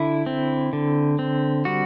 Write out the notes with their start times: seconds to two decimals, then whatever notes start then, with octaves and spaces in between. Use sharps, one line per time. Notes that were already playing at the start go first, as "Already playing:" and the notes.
Already playing: D3 E4
0.26 C4
0.73 D3
1.19 C4
1.65 G3 F#4